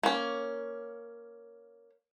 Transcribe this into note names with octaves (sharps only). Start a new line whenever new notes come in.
A#3 C#4